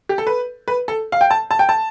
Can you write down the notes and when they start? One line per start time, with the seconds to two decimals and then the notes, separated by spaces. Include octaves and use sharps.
0.09 G4
0.18 A4
0.27 B4
0.68 B4
0.88 A4
1.12 F5
1.21 G5
1.31 A5
1.51 A5
1.59 G5
1.69 A5